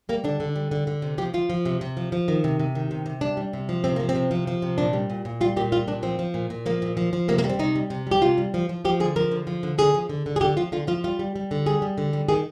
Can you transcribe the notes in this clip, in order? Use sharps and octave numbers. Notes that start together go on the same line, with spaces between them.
G3 A#3
D3 D4
D3
G3
D3
D3
C3
F3 G4
F3 F4
F3
C3
C3
F3
F3
D#3
C3
C3
D#3
C3
C3
G3 D4
G3
C3
F3
C3 C4
F3 A#3
C4
C3
F3
F3
C3
A#2 D4
G3
A#2
A#2
G3 F4
A#2 G4
G3 F4
A#2 D4
F3 C4
F3
A#2
A#2
F3 A#3
A#2
F3
F3
C3 A#3
A#3
G3
C4
C3 D#4
G3
C3
G3 G4
C3 F4
G3
F3
F3
F3 G4
D3 G#4
F3 A#4
D3
F3
D3
D3 G#4
F3
D3
D3
G#4
D3 G4
F3 F4
D3 F4
F3 F4
G3 F4
G3
G3
D3
G3 G#4
G3
D3
G3
D#3 G#4